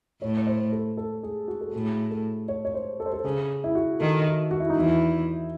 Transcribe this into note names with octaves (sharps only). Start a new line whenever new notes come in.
A2 C#5
C#5
C5
A4
A4
G#4
F#4
A4
A2 G#4
A4
C#5
C#5
C5
A4
C5
A4
C#3 G#4
E4
F#4
D#3 A4
F#4
F#4
E4
D#4
E2 E3 E4